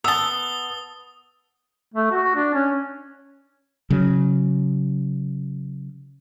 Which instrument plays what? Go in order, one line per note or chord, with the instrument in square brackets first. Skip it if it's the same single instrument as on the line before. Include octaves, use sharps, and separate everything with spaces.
[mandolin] B3 A5 [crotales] D#6 G7 [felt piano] E6
[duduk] A3
F#4
D4
C#4
[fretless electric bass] C#3 F#3